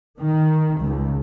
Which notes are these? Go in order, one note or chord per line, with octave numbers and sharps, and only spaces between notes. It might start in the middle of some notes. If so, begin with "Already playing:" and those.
D#3
C#2